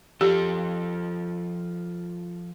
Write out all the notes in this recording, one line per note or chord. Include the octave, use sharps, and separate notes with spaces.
F3 F4 G4 A4